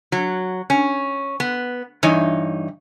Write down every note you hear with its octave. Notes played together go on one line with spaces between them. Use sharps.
F#3
C#4
B3
G2 E3 D#4 C#5